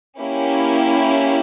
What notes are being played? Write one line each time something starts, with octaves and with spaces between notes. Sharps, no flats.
A#3 C#4 E4 G4